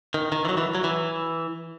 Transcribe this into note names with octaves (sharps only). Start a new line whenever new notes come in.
D#3
D#3
E3
F#3
E3
F#3
E3